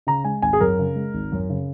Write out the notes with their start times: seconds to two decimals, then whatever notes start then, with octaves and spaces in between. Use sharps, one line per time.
0.07 C#3 A#5
0.24 G#3 G#5
0.42 G#1 G#5
0.53 G#4
0.61 F#2 A#4
0.79 C#3
0.96 G#3
1.14 G#1
1.32 F#2
1.50 C#3